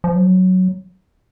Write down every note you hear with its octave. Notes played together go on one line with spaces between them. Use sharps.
F3
F#3